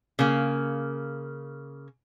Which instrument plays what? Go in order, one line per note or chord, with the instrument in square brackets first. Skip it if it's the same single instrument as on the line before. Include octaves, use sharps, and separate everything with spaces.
[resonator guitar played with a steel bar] C#3 A#3